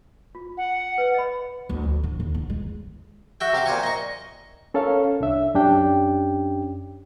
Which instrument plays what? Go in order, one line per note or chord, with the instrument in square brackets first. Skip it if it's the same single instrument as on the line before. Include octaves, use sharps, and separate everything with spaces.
[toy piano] F4
[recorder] F#5
[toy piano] B4 D5
D#5 B5
[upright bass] D2
F3
D3
D#2
D3
G#3
[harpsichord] F#4 E5 G5
C3 G4 F5 D6
A#2 C5 G#5 C#6
D#5 C#6
[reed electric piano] C#4 A4 A#4 C#5 F5
C2 D4 E5
F#2 C#4 D4 G4 G5